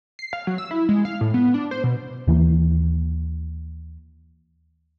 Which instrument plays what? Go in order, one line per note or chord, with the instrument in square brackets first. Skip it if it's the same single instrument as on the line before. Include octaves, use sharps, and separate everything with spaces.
[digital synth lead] C7
F5
F#3
E6
E4
G#3
F5
A2
B3
D4
C5
B2
[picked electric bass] D#2 E3 A#3